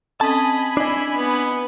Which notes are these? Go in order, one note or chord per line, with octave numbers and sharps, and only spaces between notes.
C4 C#4 A4 D#5 G#5 A5 B5
D4 E4 D#5
B3